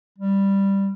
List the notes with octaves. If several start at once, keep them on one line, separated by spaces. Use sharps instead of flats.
G3